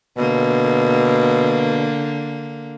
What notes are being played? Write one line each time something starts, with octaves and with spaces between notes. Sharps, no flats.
B2 D3 A#3